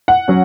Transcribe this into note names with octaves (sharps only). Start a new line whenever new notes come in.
F#5
F#3 C#4